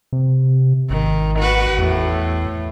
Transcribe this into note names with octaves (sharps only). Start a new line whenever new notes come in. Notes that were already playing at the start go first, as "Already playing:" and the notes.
C3
G#1 D#3
F#4 B4
E2 A2